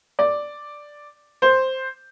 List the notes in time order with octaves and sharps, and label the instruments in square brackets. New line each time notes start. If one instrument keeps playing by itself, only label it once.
[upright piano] D5
C5